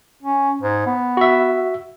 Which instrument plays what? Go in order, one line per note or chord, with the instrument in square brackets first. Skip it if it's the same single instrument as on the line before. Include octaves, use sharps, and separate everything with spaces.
[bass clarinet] C#4
G#2
B3
[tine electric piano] F#4 E5